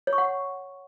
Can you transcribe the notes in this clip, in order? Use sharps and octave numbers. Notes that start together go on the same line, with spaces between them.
C#5
C#6
F#5